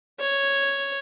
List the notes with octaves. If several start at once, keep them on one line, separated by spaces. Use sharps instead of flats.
C#5